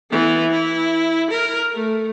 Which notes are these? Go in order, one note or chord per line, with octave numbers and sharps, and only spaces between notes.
E3 B3
E4
A#4
A3